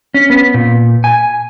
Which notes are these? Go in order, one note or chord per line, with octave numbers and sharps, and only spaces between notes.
C#4
B3
A#2
G#5